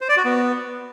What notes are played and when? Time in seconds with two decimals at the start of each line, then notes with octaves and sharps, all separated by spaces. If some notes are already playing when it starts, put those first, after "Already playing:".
0.01 C5
0.09 D5
0.17 F#4
0.25 B3